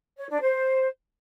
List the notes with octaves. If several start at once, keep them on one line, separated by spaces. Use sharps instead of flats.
C#5
D4
C5